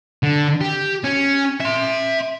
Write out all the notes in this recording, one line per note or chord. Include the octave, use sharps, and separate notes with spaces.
D3
G4
C#4
E5 C6